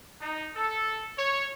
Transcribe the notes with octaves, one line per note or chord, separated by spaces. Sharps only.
D#4
A4
C#5